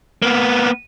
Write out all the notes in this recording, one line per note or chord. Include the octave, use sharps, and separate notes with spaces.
A#3 B3